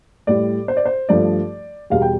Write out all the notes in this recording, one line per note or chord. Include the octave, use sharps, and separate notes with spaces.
A2 G3 D5
C5
D5
C5
G2 F3 A3 D5
E2 B2 G3 F5
G5